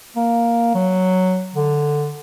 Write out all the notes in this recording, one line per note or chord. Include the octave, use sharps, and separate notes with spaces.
A#3
F#3
D3